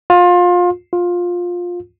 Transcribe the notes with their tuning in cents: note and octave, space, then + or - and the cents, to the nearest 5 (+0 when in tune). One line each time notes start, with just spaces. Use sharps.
F4 +25
F4 +15